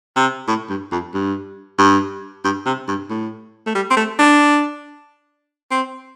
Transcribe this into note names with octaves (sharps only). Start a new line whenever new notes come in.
C3
A2
G2
F2
G2
G2
G2
C3
G2
A2
A3
G3
C4
A3
D4
C4